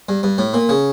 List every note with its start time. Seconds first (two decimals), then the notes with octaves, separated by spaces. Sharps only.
0.09 G2
0.23 G2
0.38 A2
0.54 A#2
0.69 C#3